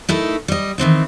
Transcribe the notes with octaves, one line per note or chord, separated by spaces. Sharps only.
A3 D#4 E4 A#4
G3 D#5
D#3 E3 C4 D#4